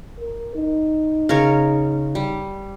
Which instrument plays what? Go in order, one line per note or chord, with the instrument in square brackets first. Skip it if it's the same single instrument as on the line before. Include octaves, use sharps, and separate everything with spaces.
[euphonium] A#4
D#4
[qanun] C#3 A#4 C#5
G3